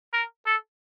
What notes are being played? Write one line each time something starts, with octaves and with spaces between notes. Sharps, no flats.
A#4
A4